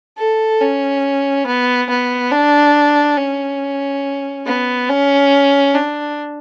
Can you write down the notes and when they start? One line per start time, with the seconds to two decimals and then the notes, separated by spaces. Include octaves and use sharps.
0.18 A4
0.61 C#4
1.46 B3
1.89 B3
2.32 D4
3.17 C#4
4.46 B3
4.89 C#4
5.75 D4